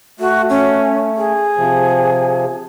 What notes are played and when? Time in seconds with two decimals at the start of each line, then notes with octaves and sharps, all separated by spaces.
0.20 A3 F#4
0.49 C#4
1.17 G#4
1.58 C3 F3